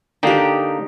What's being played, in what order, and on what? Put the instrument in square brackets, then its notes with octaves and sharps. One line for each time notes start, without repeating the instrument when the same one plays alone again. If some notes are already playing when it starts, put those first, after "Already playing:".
[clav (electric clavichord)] D3 A#3 G5 [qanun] D#4 G4